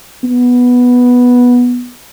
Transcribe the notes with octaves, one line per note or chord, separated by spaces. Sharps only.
B3